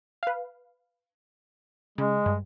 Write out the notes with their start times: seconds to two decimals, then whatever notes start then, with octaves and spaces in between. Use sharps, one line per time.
0.23 B4 F5
1.98 C#3 G#3
2.26 G2